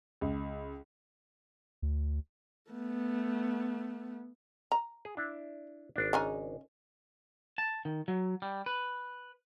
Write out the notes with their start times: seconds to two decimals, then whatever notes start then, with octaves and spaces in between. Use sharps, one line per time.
0.21 C#2
1.82 D2
2.71 A3 B3
4.72 A#5
5.05 G#4
5.17 D4 E4
5.96 G#1 D4
6.13 C#3 D#4 G#5
7.58 A5
7.85 D#3
8.08 F#3
8.42 G3
8.66 B4